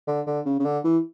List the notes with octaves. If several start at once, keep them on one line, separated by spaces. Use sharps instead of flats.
D3
D3
C#3
C#3
D3
E3